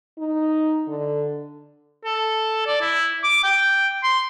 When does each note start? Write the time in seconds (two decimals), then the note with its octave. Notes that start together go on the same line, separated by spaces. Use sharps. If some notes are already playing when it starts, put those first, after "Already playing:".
0.19 D#4
0.88 D3
2.05 A4
2.67 D5
2.81 E4
3.24 D6
3.44 G5
4.04 C6